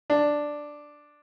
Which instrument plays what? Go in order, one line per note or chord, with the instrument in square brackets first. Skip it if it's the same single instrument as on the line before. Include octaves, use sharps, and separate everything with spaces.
[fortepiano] D4